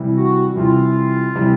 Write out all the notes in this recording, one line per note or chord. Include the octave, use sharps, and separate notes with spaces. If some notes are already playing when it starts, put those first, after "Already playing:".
Already playing: C3 E3 G3
F#4
C3 E3 G3 F4
C3 E3 G3